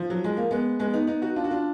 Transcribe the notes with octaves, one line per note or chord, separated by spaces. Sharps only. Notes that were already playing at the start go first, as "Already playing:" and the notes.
Already playing: F3
F#3
G#3
A#3
G#3 B3
G#3 B3
B3 D#4
B3 D#4
D#4 F#4
D4 F4
F#4
D4 F4